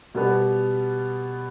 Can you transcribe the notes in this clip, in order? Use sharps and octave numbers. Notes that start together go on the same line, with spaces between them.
B2 G3 B3